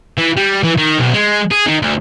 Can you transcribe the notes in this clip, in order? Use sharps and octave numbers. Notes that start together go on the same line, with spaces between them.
E3
G3
E3
D#3
B1
G#3
G#4
D#3
D2